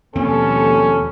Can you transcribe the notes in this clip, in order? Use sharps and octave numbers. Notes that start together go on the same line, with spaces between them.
D#2 B2 F3 G3 A#3 C4 C#4 A4